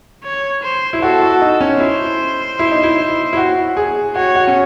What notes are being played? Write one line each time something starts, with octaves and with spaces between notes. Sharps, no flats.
C#5
C5
E4
F#4 A4
F#4
D#4
C#4
E4 C5
E4
D#4
E4
E4
F#4
G#4
F#4 C#5
F#4
C#4